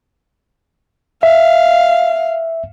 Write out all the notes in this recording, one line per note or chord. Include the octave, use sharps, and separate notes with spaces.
E5 F5